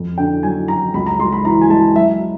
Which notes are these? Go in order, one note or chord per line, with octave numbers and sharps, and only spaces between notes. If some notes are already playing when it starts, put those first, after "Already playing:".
Already playing: F2
D3 G5
F#3 G#5
F#3 A#5
C#2 B5
A#5
G#3 C6
B5
E3 A#5
G#5
G#3 A5
F#3 E5